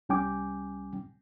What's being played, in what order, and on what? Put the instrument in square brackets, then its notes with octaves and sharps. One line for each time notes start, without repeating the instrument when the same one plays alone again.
[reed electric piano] C2 G3 C#4 G5 G#5 D6